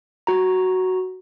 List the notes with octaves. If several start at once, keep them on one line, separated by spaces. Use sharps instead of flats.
F#4 A#5